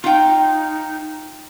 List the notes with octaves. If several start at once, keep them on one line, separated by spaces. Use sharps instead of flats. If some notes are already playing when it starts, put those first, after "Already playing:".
D#4 F4 G5